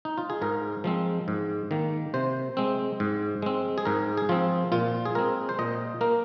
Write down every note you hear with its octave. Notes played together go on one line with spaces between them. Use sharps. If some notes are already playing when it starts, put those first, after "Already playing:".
D#4
F4
G#4
G#2 A#4
F3 G#3 C4
G#2
D#3 A#3
C3 C5
G#3 C4
G#2
G#3 C4
G#4
G#2 A#4
G#4
F3 C4 F4
A#2 F4
G#4
G#3 C4 A#4
C5
A#2 D#5
A#3 A#4